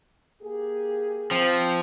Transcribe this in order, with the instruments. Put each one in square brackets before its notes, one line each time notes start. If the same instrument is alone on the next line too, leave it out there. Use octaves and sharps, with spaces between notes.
[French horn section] A#3 G4 G#4
[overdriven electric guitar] F3 [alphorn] C4